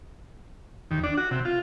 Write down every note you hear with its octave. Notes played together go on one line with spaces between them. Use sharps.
D#2
D4
F#4
C3
F4